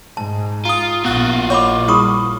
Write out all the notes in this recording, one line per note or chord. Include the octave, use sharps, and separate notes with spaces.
G#2 A5
F4 A#5 D#6
A#1 B3 F4 F#4 F#6 G7
C#5 D#5 F#5 B5 C#6 D6
G3 E4 G#4 B5 C#6 D#6